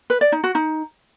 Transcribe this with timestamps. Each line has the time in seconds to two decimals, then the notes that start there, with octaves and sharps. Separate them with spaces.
0.10 B4
0.21 D5
0.32 D#4
0.44 F#4
0.55 D#4